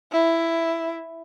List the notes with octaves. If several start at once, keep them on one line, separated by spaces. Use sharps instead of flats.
E4